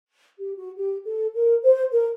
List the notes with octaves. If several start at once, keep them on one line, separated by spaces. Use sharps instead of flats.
G4
F#4
G4
A4
A#4
C5
A#4